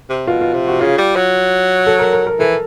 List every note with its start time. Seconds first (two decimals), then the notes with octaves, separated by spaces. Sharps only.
0.10 C3
0.27 B2 F4
0.41 F4
0.54 C3
0.68 F#4
0.81 C#3 F4
0.98 G3
1.16 F#3
1.87 A4
1.99 A#4
2.13 A#4
2.27 A#4
2.39 E3 A4